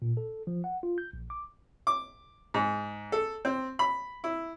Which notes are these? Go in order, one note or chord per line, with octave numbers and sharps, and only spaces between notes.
A#2
A4
F3
F#5
F4
G6
A#1
D6
D6
G#2
A4
C4
B5
E4